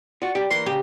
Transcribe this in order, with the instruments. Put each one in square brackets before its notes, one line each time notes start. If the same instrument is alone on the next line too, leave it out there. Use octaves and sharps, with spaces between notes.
[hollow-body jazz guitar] F4 F#4 [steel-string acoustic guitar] D5
[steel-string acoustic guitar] C3 G3 [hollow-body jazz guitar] G4
[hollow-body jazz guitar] E3 A#3 [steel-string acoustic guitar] A#5 [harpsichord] C6
[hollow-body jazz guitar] C#3 [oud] G4